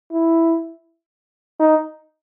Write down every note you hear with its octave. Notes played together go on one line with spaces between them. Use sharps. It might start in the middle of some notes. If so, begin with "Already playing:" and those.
E4
D#4